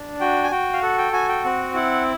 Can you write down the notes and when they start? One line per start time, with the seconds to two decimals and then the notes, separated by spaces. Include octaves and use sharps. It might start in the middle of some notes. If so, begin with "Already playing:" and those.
Already playing: D4
0.20 F#4 G5
0.44 G#5
0.51 F#4 G5
0.73 F5
0.82 A4 F#5
0.98 G5
1.13 F#4 G#5
1.29 G5
1.44 C4 F#5
1.74 E4 F#5